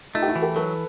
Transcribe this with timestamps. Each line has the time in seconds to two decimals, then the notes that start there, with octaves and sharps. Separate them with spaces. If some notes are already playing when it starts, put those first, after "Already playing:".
0.14 A3 D#4 F4
0.22 G4
0.28 E4 F#4
0.36 E3
0.42 G4 A4
0.56 F#3 A4 B4